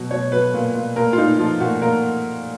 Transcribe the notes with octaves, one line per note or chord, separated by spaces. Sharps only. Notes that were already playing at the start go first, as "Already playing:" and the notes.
Already playing: B2 F#3
B2 C#5
F#3 B4
A#2
A#2
A#2 A#4
F4
A#2 D#4
F3 F4
A#2 F#4
A#2 A#4